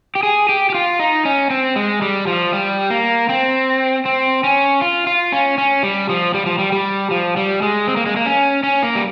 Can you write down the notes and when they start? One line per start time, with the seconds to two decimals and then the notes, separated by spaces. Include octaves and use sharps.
0.15 G4
0.23 G#4
0.49 G4
0.70 G4
0.75 F4
1.00 D#4
1.25 C#4
1.50 C4
1.76 G#3
2.02 G3
2.27 F3
2.53 G3
2.90 A#3
3.29 C4
4.05 C4
4.44 C#4
4.81 F4
5.07 F4
5.32 C#4
5.58 C#4
5.83 G3
6.09 F3
6.34 G3
6.46 F3
6.59 G3
6.72 G3
7.11 F3
7.37 G3
7.62 G#3
7.88 C4
7.97 A#3
8.06 G#3
8.16 A#3
8.26 C#4
8.63 C#4
8.83 A#3
8.95 G3